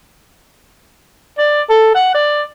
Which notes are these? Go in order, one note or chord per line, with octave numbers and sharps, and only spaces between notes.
D5
A4
F#5
D5